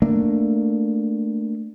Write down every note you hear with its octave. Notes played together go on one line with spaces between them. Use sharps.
A3 A#3 D4